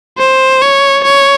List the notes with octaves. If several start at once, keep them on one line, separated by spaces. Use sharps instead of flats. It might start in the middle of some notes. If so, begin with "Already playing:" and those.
C5
C#5
C#5